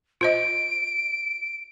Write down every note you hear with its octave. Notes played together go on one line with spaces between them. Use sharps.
F4 C5 D#5 D7